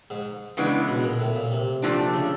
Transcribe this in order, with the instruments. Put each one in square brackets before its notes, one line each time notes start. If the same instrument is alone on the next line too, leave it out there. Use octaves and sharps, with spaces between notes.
[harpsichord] G#2
[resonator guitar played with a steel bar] C#3 E3 G#3 B3 D4
[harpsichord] B2
A#2
A2
A#2
C3
[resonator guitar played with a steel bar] A#2 F3 A3 D4
[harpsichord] C#3